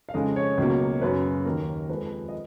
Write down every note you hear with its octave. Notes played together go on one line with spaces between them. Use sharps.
F5
F2 C#3 G#3 D#5
C#5
C#2 B2 F#3 A#3
F#2 C#3 F#3 B4
D#2 D#3 A#3 A#4
F2 F3 G#3 B4
D#5